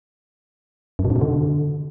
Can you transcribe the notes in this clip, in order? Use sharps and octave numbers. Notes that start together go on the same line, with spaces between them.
F#2
B2
G#2
B2
D3